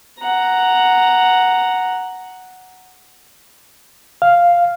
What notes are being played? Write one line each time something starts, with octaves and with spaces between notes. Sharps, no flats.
F#5 A#5
F5